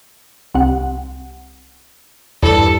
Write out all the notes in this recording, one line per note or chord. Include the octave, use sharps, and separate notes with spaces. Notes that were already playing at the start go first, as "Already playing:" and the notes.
C2 F#5
E2 G2 A4